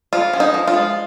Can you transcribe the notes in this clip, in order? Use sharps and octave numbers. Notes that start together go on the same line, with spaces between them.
F3 F4
C#4
D#4
F3
F4
G#3